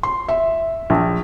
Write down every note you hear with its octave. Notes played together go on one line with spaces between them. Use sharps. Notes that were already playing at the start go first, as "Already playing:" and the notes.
C6
E5
A#1